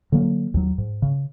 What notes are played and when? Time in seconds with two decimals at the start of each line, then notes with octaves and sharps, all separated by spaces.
0.12 D3 F#3 A#3
0.54 D#2 F#3
0.78 G#2
1.02 C#3